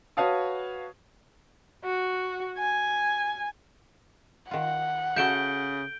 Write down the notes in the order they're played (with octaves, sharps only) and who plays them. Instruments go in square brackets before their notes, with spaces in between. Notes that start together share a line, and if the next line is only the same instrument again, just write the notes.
[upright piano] F#4 B4 C#5 F5 A5 D#6
[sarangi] F#4
G#5
[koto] D#3 F4 [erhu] F#5
[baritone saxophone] C#3 [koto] F#4 A4 E5 [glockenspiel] G6 D7 G7